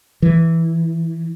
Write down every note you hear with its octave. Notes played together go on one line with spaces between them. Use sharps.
E3